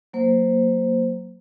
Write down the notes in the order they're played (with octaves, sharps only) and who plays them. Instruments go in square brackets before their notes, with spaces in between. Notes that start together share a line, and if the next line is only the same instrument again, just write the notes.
[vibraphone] F#3 A#3 C5